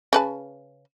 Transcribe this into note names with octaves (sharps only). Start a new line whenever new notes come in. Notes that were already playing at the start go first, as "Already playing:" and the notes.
C#3 B4 A5